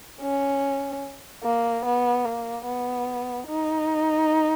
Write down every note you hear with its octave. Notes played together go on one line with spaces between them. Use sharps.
C#4
A#3
B3
A#3
B3
D#4